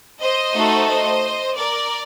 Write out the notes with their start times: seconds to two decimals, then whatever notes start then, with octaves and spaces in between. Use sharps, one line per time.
0.22 C5 D#5
0.55 A3 D#4 F#4 A4
0.89 C5 D#5
1.56 A#4 D5